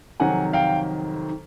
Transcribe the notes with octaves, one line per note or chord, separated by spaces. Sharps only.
F2 C3 D#3 F#3 F#5 G#5
F5 G5